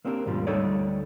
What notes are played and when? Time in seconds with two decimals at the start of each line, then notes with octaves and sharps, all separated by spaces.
0.05 A#3 C4 D4 G4 G#4 A#4
0.26 D#2 G#2 B2 F3 G3 A#3
0.47 D2 G3 D#4 A4 C#5 D5